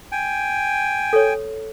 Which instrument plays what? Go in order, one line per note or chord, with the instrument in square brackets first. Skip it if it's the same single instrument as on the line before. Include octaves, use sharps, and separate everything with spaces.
[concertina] G5 G#5
[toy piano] A4 C#5